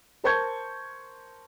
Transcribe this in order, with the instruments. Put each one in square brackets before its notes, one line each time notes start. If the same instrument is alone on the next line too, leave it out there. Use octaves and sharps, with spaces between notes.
[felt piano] A#4 C5 A5 C#6 G6 G#6